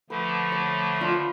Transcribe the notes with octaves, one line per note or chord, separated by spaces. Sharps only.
D3 F3 A3 B4
C#5
D4 F4 B5